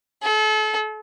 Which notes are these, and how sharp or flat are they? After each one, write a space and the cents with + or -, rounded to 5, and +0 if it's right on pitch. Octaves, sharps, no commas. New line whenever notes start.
A4 -35